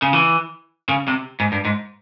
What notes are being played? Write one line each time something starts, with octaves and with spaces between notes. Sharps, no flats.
C#3
E3
C#3
C3
G#2
G2
G#2